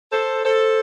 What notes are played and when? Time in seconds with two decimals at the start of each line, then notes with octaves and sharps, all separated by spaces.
0.12 A4 C5
0.44 A4 C5